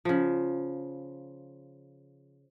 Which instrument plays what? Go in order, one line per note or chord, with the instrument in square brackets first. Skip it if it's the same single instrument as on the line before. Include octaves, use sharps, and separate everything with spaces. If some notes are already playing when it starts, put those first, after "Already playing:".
[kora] C#3 F3